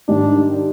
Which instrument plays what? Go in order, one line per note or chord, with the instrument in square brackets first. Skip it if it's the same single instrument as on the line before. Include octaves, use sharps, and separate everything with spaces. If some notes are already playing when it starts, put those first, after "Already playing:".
[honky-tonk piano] G#2 D#3 G3 [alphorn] D4